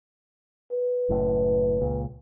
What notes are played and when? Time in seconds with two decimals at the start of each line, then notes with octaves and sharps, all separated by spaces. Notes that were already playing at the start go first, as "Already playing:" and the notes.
0.72 B4
1.09 F#1 F#2 A2
1.81 C#2 A#2